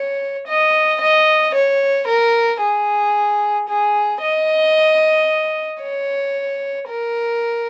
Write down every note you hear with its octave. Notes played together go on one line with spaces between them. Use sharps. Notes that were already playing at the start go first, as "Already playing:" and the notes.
Already playing: C#5
D#5
D#5
C#5
A#4
G#4
G#4
D#5
C#5
A#4